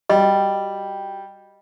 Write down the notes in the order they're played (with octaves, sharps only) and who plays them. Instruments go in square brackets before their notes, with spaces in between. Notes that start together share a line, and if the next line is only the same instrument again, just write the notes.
[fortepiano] G3 [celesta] F#4 G5 [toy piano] D#5